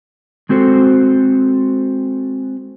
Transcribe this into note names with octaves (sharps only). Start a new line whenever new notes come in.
G#3 C4 F#4 A4 C5